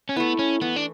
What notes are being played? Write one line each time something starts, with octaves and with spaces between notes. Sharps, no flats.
C#4
A3 B3 E4
C#4
E3 B3
D4